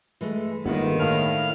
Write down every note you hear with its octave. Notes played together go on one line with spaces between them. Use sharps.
E3 G#3 A3
G1 D#3 G#3 A#3 B3
A2 E4 F5 F6